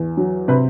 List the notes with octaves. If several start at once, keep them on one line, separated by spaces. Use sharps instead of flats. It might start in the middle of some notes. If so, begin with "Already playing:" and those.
Already playing: E2
F#3
C3 B4